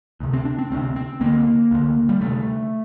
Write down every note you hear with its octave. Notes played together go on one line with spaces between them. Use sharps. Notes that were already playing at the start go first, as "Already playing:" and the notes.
D2 C3
C4
D4
C4
D2 C3 C4
C4
D2 D3 A#3
D2 D3
G3
D2 C3 A3